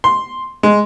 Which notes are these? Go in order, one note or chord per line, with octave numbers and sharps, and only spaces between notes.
C6
G#3